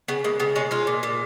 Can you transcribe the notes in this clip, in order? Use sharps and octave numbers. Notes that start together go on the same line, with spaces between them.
C#3 B3
G#3 A#3
C#3 B3
G#3 C#4
G#3 F4
A#2
A#2